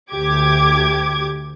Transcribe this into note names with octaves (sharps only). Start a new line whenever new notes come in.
D2 G4 D6 G#6